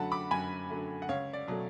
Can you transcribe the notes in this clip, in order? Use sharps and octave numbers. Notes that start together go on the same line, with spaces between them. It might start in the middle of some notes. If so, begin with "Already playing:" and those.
Already playing: F#2 D3 F#3 A3 F#5 A5 B5
B5 D6
F#2 G#5 B5
D3 F#3 A3
F#5
C#2 C#5 F5
D5
B2 F#3 A3